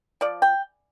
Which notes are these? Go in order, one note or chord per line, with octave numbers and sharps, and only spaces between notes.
F3 D5
G5